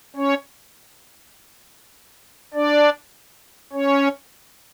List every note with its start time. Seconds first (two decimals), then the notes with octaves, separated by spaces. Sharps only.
0.16 C#4 C#5
2.54 D4 D5
3.73 C#4 C#5